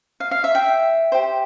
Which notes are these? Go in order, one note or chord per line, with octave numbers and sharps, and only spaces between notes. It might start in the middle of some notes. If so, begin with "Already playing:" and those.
F5
F5
E5
E5 G5
G4 C5